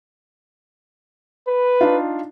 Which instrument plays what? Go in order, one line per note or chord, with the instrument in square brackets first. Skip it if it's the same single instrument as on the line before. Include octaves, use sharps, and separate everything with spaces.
[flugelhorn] B4
[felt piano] D4 D#4 F4